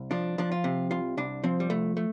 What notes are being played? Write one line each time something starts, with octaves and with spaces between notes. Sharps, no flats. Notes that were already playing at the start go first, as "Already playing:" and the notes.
Already playing: C2
F3 D4
F3 D4
F4
C3
C2 F4
C2 D4
F3 C4
G3
C2 A3
A3